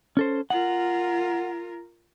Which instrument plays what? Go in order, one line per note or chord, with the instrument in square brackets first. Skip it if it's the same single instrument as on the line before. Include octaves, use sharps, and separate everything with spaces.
[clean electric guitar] C#4 A4 C5
[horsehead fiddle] F4 A#4 [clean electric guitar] F#5